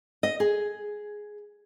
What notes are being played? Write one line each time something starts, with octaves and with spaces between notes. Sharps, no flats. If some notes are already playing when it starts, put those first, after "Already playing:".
D#5
G#4